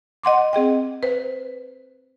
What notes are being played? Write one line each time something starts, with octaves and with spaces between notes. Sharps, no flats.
D#5 F#5 C6 D6
C4 G#4 D#5 G5
B4 C5